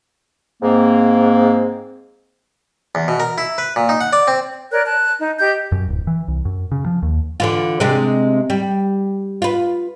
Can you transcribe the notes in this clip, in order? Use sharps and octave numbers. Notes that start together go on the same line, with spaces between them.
G#2 A#3 C4
E2
B2
A#4
E4
B4
A#2
D#4
F#5
D5
C4
A#4 C#5 D5 F#6
A5 F#6
D#4
G4 D#5 G6
F#2
D1
E3
C2
F#2
C#3
F3
D#2
D3 E3 F4
C3 G#3 D4
G3
F4 B4